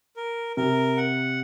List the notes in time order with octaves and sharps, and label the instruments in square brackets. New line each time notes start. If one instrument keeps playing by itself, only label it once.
[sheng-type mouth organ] A#4
[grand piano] C3 [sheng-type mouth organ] A#4
[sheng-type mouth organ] F#5